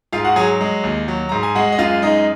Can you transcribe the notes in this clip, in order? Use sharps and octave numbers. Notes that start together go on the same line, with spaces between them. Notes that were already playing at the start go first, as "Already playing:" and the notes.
G#2 F4 F5
F#4 F#5
F#3 G#4 G#5
G#3
D#2
F#3
G#2 A#5
G#5
G#3 F#4 F#5
D#5
F#2 F4 F5
G#3 D#4 D#5